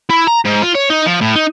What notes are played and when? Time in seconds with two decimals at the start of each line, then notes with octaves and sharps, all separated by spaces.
0.10 E4
0.27 A#5
0.45 G#2
0.62 F4
0.75 C#5
0.90 D#4
1.06 F3
1.21 A2
1.36 D#4